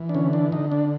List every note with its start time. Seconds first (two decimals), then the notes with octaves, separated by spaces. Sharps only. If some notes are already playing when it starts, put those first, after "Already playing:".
Already playing: E3
0.09 D4
0.14 D3 C#4
0.33 D4
0.52 D3 D#4
0.72 D4